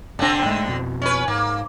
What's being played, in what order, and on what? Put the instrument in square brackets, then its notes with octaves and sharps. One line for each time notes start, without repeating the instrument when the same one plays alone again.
[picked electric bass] F1 D4 [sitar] D3 C4
[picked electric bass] G#2 G#3 A3
F2 B2
[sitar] C#4 B4
[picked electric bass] G#2 [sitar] A#3